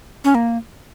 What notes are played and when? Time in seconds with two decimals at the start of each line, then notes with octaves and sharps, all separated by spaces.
0.24 C#4
0.35 A#3